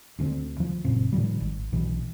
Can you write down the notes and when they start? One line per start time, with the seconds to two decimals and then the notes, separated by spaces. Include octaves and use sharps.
0.19 D2 D3 G#3 C4
0.60 F3
0.85 F#1 A#2 C#3 C4
1.13 A2 D#3 F3 G3
1.40 G#1
1.72 B1 B2 E3